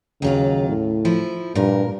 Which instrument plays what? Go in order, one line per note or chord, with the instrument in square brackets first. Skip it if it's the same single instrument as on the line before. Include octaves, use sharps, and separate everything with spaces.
[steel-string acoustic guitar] D#2 F#3 F4 [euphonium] C#3
[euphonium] A2
[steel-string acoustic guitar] F3 E4
[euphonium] G2 [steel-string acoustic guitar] A#2 A#4